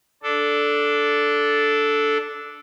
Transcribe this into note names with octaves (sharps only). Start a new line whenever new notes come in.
D4 A4